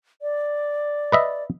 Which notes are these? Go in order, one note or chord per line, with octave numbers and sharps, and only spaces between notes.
D5
B4 D#5 E5